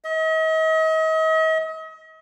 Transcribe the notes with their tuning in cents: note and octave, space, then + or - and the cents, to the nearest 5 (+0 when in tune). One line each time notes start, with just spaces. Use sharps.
D#5 +40